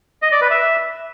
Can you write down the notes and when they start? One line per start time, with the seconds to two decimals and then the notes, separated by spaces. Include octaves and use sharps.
0.22 D#5
0.32 D5
0.41 B4
0.51 E5